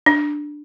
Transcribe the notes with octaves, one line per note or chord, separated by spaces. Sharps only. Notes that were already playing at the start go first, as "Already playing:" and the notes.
D4